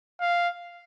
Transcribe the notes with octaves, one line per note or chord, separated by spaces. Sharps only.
F5